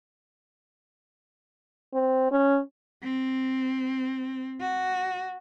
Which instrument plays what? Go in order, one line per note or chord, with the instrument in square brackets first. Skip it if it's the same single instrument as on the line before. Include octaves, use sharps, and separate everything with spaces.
[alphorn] C4
C#4
[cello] C4
F#4